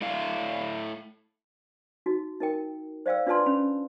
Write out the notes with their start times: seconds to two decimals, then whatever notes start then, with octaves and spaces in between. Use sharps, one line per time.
0.01 A3 E4 F5
2.06 D#4 F#4
2.40 D#4 A#4 G5
3.06 C5 D5 F5 G5 E6
3.27 D4 F4 B4 D5 A5 C6
3.46 C#4 B5